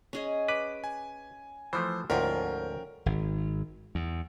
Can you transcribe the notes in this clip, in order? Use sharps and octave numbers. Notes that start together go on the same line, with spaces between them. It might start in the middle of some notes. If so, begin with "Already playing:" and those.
C#4 G#4 D#5
B4 D6
G#5
E3 F3 A3 C5
D2 G#2 F3 C#4 A#4 G5
G#1
E2